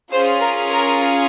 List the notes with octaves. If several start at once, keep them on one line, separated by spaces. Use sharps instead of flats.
C#4 F4 G#4 C5
A#4
A#4